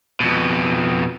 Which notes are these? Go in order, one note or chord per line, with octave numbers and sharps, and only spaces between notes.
F2 B2